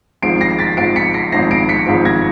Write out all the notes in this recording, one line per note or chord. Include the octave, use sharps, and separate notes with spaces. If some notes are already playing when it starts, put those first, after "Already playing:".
G#1 G#2 F3 C7 D7
A#6 C7
A6 B6
G#1 G#2 F3 C7 D7
B6 C#7
A#6 C7
G#1 G#2 F3 A#6 C7
C7 D7
B6 C#7
G#1 G#2 F3
G#6 A#6